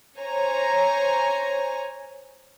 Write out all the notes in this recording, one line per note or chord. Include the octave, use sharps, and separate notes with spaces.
C5 C#5 G#5 A#5